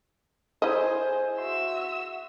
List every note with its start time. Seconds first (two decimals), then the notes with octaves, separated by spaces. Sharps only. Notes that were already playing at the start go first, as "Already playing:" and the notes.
0.62 E4 G#4 C5 D#5 G#5
1.38 F#4 E5 C6 E6